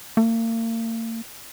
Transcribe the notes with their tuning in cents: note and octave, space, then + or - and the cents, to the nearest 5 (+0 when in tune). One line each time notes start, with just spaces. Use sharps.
A#3 -40